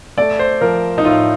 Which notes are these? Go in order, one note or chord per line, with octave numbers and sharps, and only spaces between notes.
A3 D5
C5
F3 A#4
D#4
A2 F4